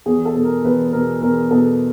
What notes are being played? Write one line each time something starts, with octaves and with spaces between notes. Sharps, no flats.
E2 G#4
A4
B2
A#4
E2 B4
B2 A#4
E2 A#4
B2 A4